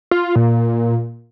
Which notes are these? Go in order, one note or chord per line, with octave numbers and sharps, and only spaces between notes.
F4
A#2